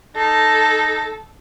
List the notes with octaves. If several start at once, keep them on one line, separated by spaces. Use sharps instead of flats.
D#4 A4